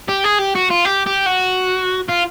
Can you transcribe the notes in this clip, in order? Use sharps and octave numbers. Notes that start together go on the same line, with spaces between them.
G4
G#4
G4
F#4
F4
G4
G4
F#4
F4